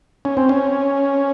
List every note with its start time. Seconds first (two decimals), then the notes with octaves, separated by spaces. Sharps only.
0.25 C#4
0.37 C4
0.49 C#4